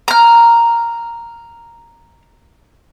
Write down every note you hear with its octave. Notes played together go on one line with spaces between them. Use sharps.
A#5 F6